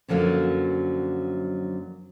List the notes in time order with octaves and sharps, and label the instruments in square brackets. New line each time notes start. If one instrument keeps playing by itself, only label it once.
[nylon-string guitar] F#2 D3 F3 F#3 A#3